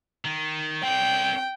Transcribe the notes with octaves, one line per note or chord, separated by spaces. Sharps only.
D#3
C4 D5 G5